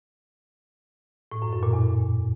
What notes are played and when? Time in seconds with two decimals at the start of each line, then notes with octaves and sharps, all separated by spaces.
1.31 A2
1.42 F#2
1.52 F#2
1.63 A#2
1.73 E2